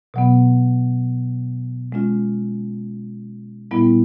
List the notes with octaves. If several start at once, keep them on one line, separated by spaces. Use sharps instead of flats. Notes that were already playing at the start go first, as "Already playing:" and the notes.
B2 F#3 B3
G#3 C#4 F4
A#2 G3 B3 E4